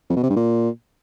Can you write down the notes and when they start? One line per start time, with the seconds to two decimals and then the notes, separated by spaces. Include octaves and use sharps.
0.10 F2
0.16 B2
0.23 C3
0.30 G2
0.36 A#2